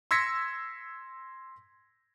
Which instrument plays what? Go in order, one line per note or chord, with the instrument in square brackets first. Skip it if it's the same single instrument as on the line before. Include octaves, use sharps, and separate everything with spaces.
[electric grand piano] C6 E6 G#6 A#6 B6 C#7